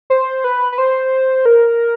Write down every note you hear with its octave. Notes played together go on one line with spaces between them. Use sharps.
C5
B4
B4
C5
A#4